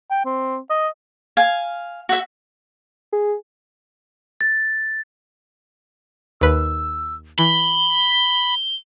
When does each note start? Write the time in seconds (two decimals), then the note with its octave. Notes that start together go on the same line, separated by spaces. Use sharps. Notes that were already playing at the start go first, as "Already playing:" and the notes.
0.10 G5
0.25 C4
0.70 D#5
1.37 F5 G#5
2.09 F#4 E5
3.13 G#4
4.41 A6
6.41 D#2 B4 E6
7.39 E3 B5 G7